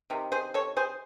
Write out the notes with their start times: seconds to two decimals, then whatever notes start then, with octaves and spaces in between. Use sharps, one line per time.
0.10 C3 D#3
0.32 G#4 C5
0.54 A4 C#5
0.77 G#4 C5